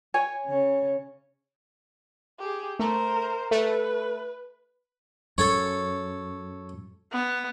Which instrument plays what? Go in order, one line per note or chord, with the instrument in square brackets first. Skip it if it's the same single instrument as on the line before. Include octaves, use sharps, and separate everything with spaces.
[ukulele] C#5 G#5
[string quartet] C#3 C#4
[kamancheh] G4 G#4
[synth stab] A3 [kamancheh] A#4 C5
[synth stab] A3 [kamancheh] B4
[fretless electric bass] F#2 [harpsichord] A4 C#5
[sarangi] B3